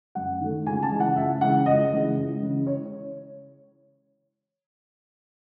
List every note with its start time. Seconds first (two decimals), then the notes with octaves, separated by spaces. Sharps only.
0.15 F#2 F#5
0.40 D#3 A3
0.66 C#2 G#5
0.83 A5
0.91 C#3 E3 G#3
1.00 F#5
1.16 C#2 E5
1.41 C#3 E3 G#3 F#5
1.66 C#2 D#5
1.92 C#3 E3 G#3
2.17 C#2
2.43 C#3 E3 G#3
2.67 C#5